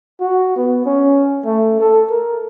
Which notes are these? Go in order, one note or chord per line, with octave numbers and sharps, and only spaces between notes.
F#4
B3
C#4
A3
A4
A#4